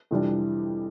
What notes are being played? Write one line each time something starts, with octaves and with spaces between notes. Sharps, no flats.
F2 C3 E3 G3 D4